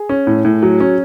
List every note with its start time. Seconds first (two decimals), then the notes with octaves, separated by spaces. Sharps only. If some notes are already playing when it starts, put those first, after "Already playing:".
Already playing: G#4
0.09 C#4
0.27 A2
0.45 A2
0.63 F#3
0.80 C#4